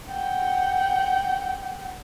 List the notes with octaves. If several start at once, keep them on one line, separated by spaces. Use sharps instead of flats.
F#5 G5